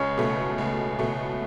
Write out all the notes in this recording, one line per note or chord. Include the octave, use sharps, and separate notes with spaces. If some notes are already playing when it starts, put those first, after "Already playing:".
Already playing: C#2 C#4
B2 A3
C#2
B2 A3